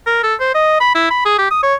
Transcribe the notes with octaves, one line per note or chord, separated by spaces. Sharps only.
A#4
A4
C5
D#5
B5
E4
B5
G#4
G4
D#6
C#5